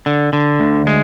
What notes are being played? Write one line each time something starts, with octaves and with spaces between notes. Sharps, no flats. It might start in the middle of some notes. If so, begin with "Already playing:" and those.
D3
D3
D2
G#3